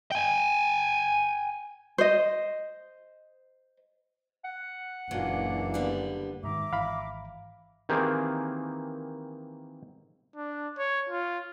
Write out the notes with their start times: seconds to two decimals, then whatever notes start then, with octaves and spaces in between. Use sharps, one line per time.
0.12 G5 G#5
1.98 C5 D#5
4.45 F#5
5.11 F#1 F#2 A#2 E3 F#3 A#3 D4
5.74 D3 G3 B3
6.44 G#2 D3 D#3 E5 A#5 D6
6.73 G#1 E3 F5 B5
7.89 D#3 E3 A#3 C4 G4 G#4
10.36 D4
10.78 C#5
11.09 F4